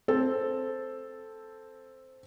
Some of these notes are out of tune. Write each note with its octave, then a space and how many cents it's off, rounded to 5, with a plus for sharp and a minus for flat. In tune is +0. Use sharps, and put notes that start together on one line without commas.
C4 +0 A4 +0